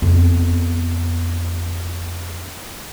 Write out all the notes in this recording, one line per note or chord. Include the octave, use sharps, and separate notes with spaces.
F2 B3